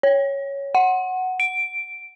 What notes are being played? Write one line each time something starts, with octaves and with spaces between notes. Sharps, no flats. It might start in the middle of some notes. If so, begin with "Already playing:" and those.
C#5
F#5
D7